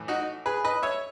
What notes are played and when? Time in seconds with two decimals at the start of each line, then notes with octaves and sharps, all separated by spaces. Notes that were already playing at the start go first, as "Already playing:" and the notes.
Already playing: A2 E3
0.08 D#4 F#4
0.46 G#4 B4
0.64 B4 D#5
0.83 C#5 E5